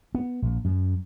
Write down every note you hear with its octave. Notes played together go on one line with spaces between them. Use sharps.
B3
A#1
F#2